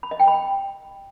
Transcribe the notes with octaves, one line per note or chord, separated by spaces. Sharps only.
B5
D#5
G5
B5